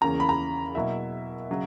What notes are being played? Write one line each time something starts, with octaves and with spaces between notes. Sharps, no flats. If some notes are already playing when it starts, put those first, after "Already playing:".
E2 C#3 E3 A#3 C#4 A#5
B5
A#5
B2 F#3 A#3 E4 E5
C#3 F#3